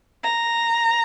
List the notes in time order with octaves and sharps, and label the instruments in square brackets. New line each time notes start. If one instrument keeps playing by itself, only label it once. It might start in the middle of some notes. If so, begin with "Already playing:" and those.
[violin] A#5